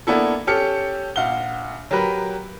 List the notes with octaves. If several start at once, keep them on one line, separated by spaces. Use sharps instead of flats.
A#3 B3 D4 E4 A4
C#4 G4 A4 F6 C#7
A#1 F5 F#5 G7
F#3 G4 A#4 B4